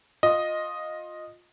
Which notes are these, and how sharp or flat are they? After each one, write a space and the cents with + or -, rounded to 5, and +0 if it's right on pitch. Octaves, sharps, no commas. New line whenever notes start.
F4 +20 D#5 +0